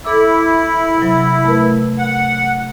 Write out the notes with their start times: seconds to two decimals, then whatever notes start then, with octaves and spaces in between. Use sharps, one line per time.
0.05 E4 A4 D6 E6
0.98 C3 F#3
1.45 A3 A#4 B4
1.99 F#5